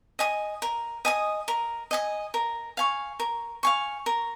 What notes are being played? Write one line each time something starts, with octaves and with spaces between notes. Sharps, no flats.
D#5 G#5 D#6
A#4
D#5 G#5 D#6
A#4
D#5 G#5 D#6
A#4
F5 G#5 C#6
A#4
F5 G#5 C#6
A#4